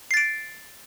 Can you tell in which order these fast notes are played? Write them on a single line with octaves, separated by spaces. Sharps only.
C7 A6 D7